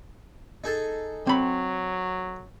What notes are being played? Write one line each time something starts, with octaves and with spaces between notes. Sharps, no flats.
D#4 G#4 A4
F#3 C4 B5